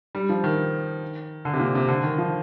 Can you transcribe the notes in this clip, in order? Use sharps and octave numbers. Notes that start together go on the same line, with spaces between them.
G3
F3
D#3
D3
C3
A#2
C3
D3
D#3
F3